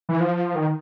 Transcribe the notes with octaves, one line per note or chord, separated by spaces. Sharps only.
E3
F3
D#3